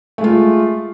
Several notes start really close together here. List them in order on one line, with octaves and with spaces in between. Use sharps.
A3 G#3 F4